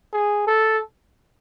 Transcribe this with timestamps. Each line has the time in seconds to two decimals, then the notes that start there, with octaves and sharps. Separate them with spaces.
0.13 G#4
0.47 A4